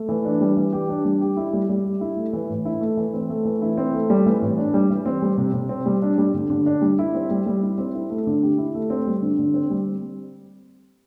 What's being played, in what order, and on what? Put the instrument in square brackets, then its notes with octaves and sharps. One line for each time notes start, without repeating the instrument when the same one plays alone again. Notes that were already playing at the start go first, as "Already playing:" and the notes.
Already playing: [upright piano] A3
E3
D4
G3
E3
G4
D4
G3
G4
E4
G3
G3
G4
E4
A3
E3
A2
E4
A3
E3
C4
A3
E3
E4
C4
A3
G3
E3
A2
D4
G3
E3
C4
G3
C3
C3
C4
G3
D4
G3
D3
D3
D4
G3
E4
C4
G3
G3
E4
C4
E4
A3
D3
G4
E4
A3
C4
G3
D3
D3
C4
G3